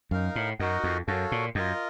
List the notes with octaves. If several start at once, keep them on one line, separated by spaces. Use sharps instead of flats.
F#2 D#4 A#4 F5
A2
F#2 D#4 F#4 A#4 D#5 F#5
F2
F#2 F#4 A4 C#5 F5
A#2
F#2 F4 A#4 D#5